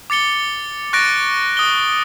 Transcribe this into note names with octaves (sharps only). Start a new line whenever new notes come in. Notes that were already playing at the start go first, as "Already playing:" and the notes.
D6 A6 C#7 G7
C#6 F#6 A6 A#6 D7
D#6 G7